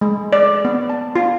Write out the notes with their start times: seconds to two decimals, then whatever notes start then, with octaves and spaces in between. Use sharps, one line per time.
0.01 G#3
0.33 D5
0.65 B3
0.90 A5
1.16 F4